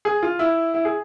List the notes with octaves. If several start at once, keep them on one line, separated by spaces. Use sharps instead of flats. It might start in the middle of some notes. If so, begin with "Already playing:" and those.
G#4
F4
E4
E4
G#4